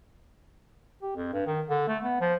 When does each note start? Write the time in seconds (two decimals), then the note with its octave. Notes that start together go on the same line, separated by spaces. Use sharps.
1.03 G4
1.16 F2
1.33 G2
1.47 D#3
1.70 D3
1.88 A3
2.03 B3
2.21 F3